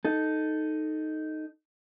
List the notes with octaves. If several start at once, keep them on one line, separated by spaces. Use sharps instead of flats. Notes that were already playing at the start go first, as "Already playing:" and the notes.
D#4 A4